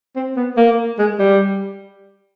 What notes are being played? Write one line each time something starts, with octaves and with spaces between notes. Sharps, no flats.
C4
B3
A#3
G#3
G3